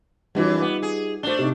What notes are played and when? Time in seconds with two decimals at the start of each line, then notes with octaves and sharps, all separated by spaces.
0.35 F#2 E3 G3 D#4 F4
0.61 B3
0.83 G#4
1.23 A3 D4 C5 G7
1.39 C3 D#4